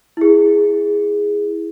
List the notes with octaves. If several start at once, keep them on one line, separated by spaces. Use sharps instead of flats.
E4 G#4